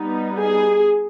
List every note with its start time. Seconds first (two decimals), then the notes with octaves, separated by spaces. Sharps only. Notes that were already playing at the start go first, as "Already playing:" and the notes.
Already playing: G3 B3 D#4
0.38 G#4